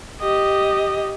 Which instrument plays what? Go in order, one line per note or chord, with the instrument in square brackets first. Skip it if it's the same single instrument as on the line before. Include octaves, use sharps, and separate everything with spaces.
[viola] G4 D#5